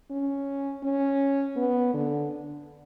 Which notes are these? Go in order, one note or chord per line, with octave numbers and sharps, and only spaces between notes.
C#4
C#4
B3
D3